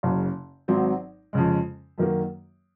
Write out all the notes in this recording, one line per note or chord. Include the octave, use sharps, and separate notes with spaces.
F#1 F#2 C#3
G#1 G#2 F#3 C4
F2 C#3 G#3
F#2 D#3 F#3 A#3